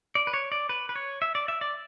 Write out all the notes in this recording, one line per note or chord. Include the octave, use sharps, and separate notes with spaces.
D5
B4
C#5
D5
B4
B4
C#5
E5
D5
E5
D5